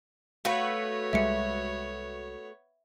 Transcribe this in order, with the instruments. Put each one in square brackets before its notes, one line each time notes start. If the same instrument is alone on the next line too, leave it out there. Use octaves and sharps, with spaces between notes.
[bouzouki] A3 F#4 B4 [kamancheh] B3 C#5 [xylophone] F5
[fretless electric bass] C2 G3 G#3 [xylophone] E5 C#7